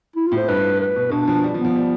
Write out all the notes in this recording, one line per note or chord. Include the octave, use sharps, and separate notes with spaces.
E4
A2 F4
C5
G2 B4
B4
B2
B2 D4
F3
G3
F3
B3
F3
G3